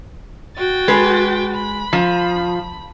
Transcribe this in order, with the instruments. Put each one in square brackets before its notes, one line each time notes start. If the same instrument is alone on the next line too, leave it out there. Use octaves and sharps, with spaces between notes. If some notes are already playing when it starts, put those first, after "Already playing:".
[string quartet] F#4 G5 A6
[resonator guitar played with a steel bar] G#3 B4
[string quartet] B5
[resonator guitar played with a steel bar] F3